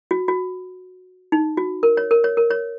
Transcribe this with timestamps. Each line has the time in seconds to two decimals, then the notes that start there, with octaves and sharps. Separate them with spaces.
0.11 F#4
0.28 F#4
1.32 D#4
1.57 F#4
1.83 A#4
1.97 C#5
2.11 A#4
2.24 C#5
2.37 A#4
2.51 C#5